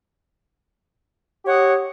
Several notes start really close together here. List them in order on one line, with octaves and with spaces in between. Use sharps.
G4 C#5 F#5 D#5